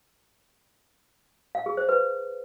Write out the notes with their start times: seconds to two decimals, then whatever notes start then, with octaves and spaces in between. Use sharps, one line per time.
1.55 F5
1.66 G#4
1.77 C5
1.89 B4